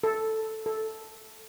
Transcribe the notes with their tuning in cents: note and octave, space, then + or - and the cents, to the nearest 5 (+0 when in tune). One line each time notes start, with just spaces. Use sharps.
A4 +0
A4 -5